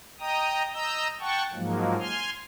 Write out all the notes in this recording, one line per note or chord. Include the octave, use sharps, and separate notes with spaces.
D#5 G5 A#5 D#6
D#5 A#5 E6 G6
F#5 G5 A5 C#6
G#2 F3 F#3 G#3 A#3
G#5 C6 F6